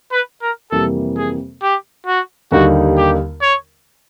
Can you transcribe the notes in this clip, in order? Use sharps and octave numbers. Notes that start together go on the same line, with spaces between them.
B4
A#4
F2 C3 E3 G3 A#3 A4
G#4
G4
F#4
D#2 D3 G3 A#3 D#4 F#4
G4
C#5